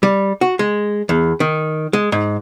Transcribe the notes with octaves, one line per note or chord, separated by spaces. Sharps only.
G3
F#4
G#3
E2
D#3
G#3
G#2